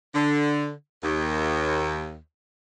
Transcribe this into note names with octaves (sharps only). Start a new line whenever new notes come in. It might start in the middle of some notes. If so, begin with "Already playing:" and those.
D3
D#2